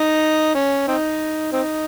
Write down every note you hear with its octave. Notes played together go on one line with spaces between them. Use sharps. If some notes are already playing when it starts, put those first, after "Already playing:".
Already playing: D#4
C#4
C4 D#4
C4 D#4